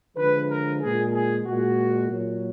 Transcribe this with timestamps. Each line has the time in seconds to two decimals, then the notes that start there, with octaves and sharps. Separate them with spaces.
0.17 D3 F3 G#3 B4
0.50 A#4
0.82 A#2 G#3 G#4
1.14 G#4
1.47 A#2 G#3 F#4
2.10 A#2 F#3